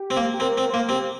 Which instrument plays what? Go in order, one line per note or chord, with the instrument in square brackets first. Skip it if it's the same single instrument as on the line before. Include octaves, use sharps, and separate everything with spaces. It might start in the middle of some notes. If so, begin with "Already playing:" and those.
Already playing: [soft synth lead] G4
[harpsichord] C4
A#3
[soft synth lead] G4
[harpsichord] C4 [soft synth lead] A#4
[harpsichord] C4
[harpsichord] A#3 [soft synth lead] C5
[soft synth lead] A#4
[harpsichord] C4 [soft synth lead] G4